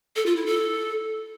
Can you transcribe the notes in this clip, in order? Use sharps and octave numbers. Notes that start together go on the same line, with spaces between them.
A4
F4
E4
A4